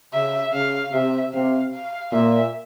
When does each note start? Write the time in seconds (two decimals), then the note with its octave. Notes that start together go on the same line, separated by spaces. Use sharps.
0.13 C#3 E5
0.53 C#3 F5
0.93 C3 E5
1.33 C3 F5
1.73 F5
2.12 A#2 E5